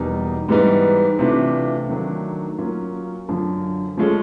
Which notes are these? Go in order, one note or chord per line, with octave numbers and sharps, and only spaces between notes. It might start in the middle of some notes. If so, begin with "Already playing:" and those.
Already playing: E2 B2 G3 A#3 D#4
G#2 E3 G3 B3 D#4
C3 E3 A3 D4 F4
D#3 F#3 A3 D4
F#3 A#3 C#4 F4
F#2 D3 F3
F3 G#3 C#4 F4 A4